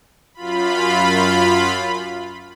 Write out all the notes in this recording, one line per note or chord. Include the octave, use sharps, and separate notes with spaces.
F#2 F4 B5